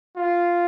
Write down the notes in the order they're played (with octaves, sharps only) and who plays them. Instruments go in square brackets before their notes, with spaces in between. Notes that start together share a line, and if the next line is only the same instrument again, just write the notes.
[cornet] F4